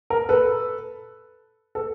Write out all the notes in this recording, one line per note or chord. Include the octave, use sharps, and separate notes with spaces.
A#4
A4 B4
A4